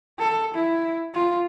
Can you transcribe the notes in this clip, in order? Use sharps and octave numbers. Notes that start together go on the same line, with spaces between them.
A4
E4
F4